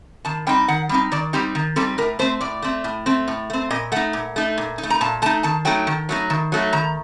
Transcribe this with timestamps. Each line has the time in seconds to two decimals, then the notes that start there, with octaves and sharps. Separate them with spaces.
0.25 D#3 A5
0.47 G3 C4 D#4 G5
0.68 D#3 F#5
0.89 G3 C4 D#4
1.12 D#3 D5
1.33 G3 C4 D#4 G4
1.55 D#3
1.76 G3 C4 D#4 A4
1.98 A2 A#4
2.19 A3 C4 C5
2.41 A2 D5
2.62 A3 C4
2.84 A2
3.06 A3 C4
3.28 A2
3.50 A3 C4
3.70 A#2 D#5
3.92 A3 D#4 F#5
4.13 A#2
4.36 A3 D#4
4.58 A#2
4.78 D#4
4.83 A3
4.90 A#5
5.01 A#2 A5
5.22 A3 A5
5.26 D#4
5.43 D#3 A5
5.65 F#3 A3 D#4 G5
5.87 D#3
6.09 F#3 A3 D#4
6.30 D#3
6.52 F#3 A3 D#4
6.73 D#3 A#5